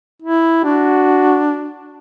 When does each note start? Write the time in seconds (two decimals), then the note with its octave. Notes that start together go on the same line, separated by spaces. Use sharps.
0.22 E4
0.64 D4 F#4